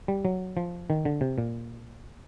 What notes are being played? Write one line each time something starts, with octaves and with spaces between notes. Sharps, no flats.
G3
F#3
F3
D#3
D3
C3
A#2